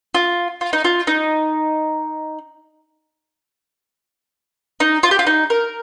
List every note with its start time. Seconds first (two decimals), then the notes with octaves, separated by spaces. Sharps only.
0.14 F4
0.61 F4
0.73 D#4
0.84 F4
1.07 D#4
4.80 D#4
5.03 F4
5.11 G4
5.19 F4
5.27 D#4
5.50 A#4